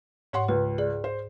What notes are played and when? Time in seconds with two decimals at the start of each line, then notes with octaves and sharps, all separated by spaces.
0.33 G#2 C#5 F#5 C6
0.48 C#2 B4
0.78 G#4 D5
1.04 C5